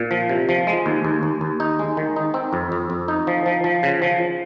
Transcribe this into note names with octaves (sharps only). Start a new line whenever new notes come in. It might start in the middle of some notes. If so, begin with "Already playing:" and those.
Already playing: A#2
F3
C3
F3
G#3
D#2
D#2
D#2
D#2
D#4
G#3
D#3
D#4
C4
F2
F2
F2
D#4
F3
F3
F3
C#3
F3